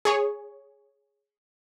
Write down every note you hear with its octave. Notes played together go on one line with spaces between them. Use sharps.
G#4 C#5